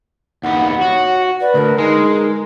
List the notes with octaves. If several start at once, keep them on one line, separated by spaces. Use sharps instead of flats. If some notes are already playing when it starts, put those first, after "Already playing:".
D#2 B3 F#5
F#4 C#5
B4 D5
D2 A#4
G#3 D#4